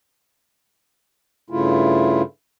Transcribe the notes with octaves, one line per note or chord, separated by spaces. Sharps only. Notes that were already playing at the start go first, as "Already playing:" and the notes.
G2 C#3 A3 E4 F4